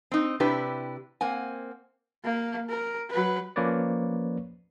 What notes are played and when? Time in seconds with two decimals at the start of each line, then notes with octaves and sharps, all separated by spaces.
0.11 C4 D#4
0.40 C3 D4 E4 G4 B4
1.21 A#3 C4 F#5 G#5
2.24 A#3
2.69 A#4
3.10 F#3 B4
3.56 F3 A#3 C#4 B4 C#5 D5